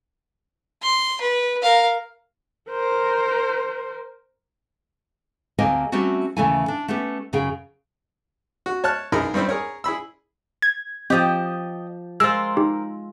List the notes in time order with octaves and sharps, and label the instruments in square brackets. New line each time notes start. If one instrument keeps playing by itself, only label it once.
[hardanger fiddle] C6
B4
A#4 F5
[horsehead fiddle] A#4 C5
[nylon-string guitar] D2 A#3 C4 G4 D#5 G#5
G3 A3 C4 C#4 F#4
D#2 C#3 E3 A3 E4 G#5
D4
A3 B3 C#4 G4
F#2 C#3 G#4 G5
[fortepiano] F#4
C#5 A5 F6 F#6
B1 D#4 E4 G#4 A#4 A#5
G2 G3 C4 E4
G#4 A#4 C#5
E4 G#4 B5 E6
[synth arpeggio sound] G#6
[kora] F3 G4 [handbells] C4 [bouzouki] D#5 G5
[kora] G#3 F4 [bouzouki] A#4 C5 [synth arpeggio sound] E6
[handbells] D#4 G4